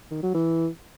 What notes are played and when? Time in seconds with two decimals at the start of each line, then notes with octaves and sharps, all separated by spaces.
0.11 D#3
0.23 F#3
0.34 E3